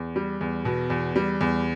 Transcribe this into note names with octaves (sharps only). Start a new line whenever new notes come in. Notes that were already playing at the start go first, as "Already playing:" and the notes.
Already playing: E2
G3
E2
B2
E2
G3
E2